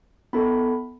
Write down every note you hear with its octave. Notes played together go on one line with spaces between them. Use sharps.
B3 E4 A4 B5